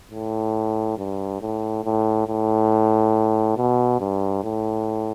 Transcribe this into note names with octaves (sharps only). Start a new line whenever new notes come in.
A2
G2
A2
A2
A2
B2
G2
A2